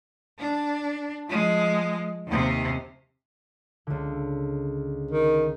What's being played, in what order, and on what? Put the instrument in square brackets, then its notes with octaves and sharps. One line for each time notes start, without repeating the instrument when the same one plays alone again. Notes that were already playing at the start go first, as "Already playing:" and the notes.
[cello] D4
F3 G#3
D#2 C3
[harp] C#2 D3
[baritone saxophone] D#3